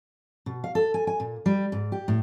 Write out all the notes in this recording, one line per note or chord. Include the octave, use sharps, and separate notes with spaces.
B2
F5
A4
G#5
G#5
A#2
G3
G#2
G4
A2